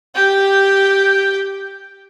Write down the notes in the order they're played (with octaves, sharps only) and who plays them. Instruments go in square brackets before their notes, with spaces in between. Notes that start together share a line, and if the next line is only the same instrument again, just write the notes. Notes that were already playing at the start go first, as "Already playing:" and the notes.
[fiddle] G4 G5